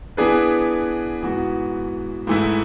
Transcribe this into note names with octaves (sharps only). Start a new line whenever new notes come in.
E3 B3 D4 G#4 B4
G#2 E3 B3 F#4
G#2 E3 A3 E4